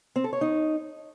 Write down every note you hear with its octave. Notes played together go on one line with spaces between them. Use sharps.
C4
A4
C#5
D#4